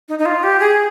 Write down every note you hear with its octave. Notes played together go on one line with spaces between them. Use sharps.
D#4
D#4
F4
G4
G#4